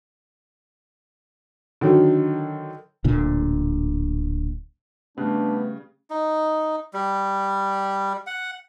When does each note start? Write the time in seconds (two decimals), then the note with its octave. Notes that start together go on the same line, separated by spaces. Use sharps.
1.81 D3 D#3 F#3
3.04 D1 A#2 D3
5.17 C#3 G3 A3 B3 D4 F#6
6.10 D#4
6.93 G3
8.27 F#5